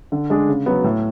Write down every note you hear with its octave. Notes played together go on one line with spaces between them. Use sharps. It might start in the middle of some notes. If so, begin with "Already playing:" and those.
D3
G#3 D4 G#4
C#3
F#3 B3
A2